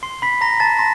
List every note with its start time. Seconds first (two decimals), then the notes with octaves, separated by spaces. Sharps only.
0.03 C6 C7
0.22 B5 B6
0.41 A#5 C6 A#6
0.60 A5 A6
0.79 C6 A#6